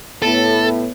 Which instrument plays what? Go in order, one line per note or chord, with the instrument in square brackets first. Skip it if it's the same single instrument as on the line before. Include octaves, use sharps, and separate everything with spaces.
[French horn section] A2 [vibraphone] B3 B4 [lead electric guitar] A4